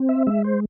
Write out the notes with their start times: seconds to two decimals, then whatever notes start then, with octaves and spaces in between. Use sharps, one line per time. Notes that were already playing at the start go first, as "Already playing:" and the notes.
Already playing: C4
0.09 E5
0.27 G#3 E5
0.44 C5